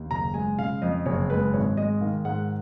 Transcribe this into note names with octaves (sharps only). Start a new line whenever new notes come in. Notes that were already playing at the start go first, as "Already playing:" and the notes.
Already playing: D#2
F#1 A#5
G#3 G#5
C#3 F5
F2 D#5
F#1 C#5
G#3 B4
G#1 C#5
G#3 D#5
D#3 F5
G#2 F#5